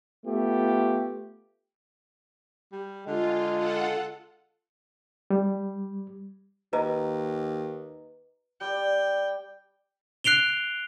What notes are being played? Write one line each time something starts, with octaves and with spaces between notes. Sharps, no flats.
A3 B3 F4 G4
G3
D3 G#3 F4
F4 A4 F#5
G3
D#2 B4 D#5 A#5
G3 D5 G5
F#6 C7 D7 F7 G7